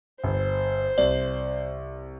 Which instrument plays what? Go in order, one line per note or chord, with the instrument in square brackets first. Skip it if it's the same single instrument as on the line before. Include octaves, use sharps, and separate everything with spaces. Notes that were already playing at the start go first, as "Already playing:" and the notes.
[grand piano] G1 [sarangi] C5
[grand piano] C2 [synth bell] D5